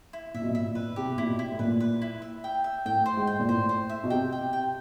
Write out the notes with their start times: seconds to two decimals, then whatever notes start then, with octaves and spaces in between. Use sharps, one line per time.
0.13 E4
0.34 A#2 E5
0.42 B2
0.49 A#2
0.55 E5
0.66 A#2
0.75 B4
0.96 C3 G4
1.06 B2
1.18 A#2 E4
1.26 B2
1.39 E4
1.52 A2
1.59 A#2 B4
1.80 B4
2.02 E4
2.22 E5
2.44 G5
2.64 E5
2.86 A2 G5
3.06 C5
3.17 G#2
3.27 G5
3.40 A#2
3.47 A2 C5
3.69 C5
3.89 E5
4.04 B2
4.10 C3 G5
4.32 G5
4.53 G5